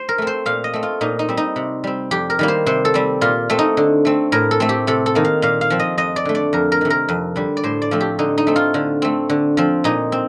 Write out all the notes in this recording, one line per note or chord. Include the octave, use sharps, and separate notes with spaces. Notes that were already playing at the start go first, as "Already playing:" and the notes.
Already playing: C5
A#4
A3 C4
C5
A#2 F5
D#5
A3 C4
F4
A#2 D#4
D#4
G3 C4
D#4
C3
G3 C4
F2 G4
A#4
D#3 G3 A#3
C5
C3 C5
A4
G3 C4
A#2 F4
A3 C4
D#4
D3
A3 C4
A2 A#4
A4
A3 C4
G4
C3 A4
A4
D#3 A#3
F5
A#2 F5
F5
F3 C4
D#5
F2 D#5
D5
D3 A3
D5
F2 A#4
A#4
C3 D#3
A#4
F2
D3 G3
D5
A2 C5
D5
F3 A3 C4
G4
D3 D#4
D#4
A3 C4
F4
D3
A3 C4
D3
F3 C4
A#2 D#4
C4